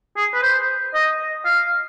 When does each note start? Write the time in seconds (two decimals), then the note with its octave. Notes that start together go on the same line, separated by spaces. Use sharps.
0.17 G#4
0.33 B4
0.42 C5
0.94 D#5
1.45 F5